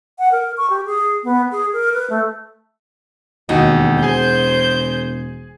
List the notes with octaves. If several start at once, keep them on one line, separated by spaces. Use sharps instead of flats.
F#5
A#4
C#6
G4
G#4
B3
G#4
A#4
B4
A3
E1 D#2 D#4 F#4 D#5
G#4 C5 G#5 G6